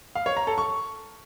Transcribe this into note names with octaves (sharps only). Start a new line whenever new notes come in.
F5
C#5
A#5
A4
C#6